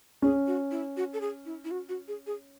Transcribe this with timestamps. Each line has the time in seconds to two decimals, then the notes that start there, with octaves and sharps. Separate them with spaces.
0.22 C#4 G#4
0.47 F#4
0.71 E4
0.97 F#4
1.13 A4
1.21 G#4
1.45 E4
1.64 E4
1.71 F#4
1.89 F#4
2.08 G#4
2.27 G#4